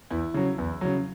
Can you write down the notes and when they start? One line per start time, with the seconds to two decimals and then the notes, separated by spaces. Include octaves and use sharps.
0.10 E2 E4
0.34 C#3 F#3
0.58 E2
0.81 C#3 F#3